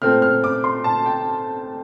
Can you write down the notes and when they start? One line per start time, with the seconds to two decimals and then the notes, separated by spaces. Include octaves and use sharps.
0.02 A#2 A3 C4 F6
0.22 F6
0.44 D6
0.64 C6
0.84 A5
1.06 G5